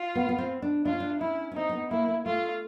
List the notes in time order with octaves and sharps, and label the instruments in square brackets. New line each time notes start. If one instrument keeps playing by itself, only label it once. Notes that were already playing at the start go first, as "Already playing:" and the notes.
Already playing: [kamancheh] F4
[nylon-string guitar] B3
B3
C4
D4
[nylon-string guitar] D4 [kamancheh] F4
[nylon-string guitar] C#4
D4
[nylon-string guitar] C#4 [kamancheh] E4
[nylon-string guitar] C#4
[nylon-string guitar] C4 [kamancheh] D#4
[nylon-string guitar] C4
B3
[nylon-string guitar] A#3 [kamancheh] E4
[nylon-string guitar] A#3
[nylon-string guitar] A3 [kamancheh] F4